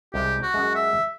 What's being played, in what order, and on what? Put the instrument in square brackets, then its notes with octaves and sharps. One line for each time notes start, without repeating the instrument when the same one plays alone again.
[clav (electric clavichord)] C2 G#3 [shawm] G4
[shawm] F#4
[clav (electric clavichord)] F#2 G#3
[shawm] E5